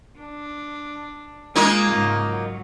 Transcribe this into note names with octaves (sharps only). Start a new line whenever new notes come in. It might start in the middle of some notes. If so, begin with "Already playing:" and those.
D4
G#3 A#3 D#4 F4
G#2 C#3
F#3